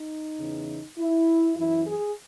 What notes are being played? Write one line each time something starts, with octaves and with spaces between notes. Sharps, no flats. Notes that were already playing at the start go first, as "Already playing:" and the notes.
Already playing: D#4
E2 C#3 E3
E4
F#2 E3 E4
G#4